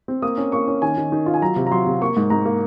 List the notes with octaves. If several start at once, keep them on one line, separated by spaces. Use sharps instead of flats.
C4
A#3 D#6
C#4
A#3 C#6
C#4
D#3 G#5
D#3
D#3
F4
G#5
F#3 A#5
C3
A#5
F#3 C6
C3
A#3 C#6
G#2
G#2 A#5
A#3